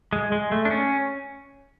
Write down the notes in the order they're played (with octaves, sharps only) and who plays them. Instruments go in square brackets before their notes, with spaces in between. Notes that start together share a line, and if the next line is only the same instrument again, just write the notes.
[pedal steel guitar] G#3
G#3
A3
D4
C#4